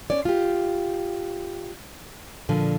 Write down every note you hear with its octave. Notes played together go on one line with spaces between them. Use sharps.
C#4 C#5 D5
F4 G4
A#2 D3 F3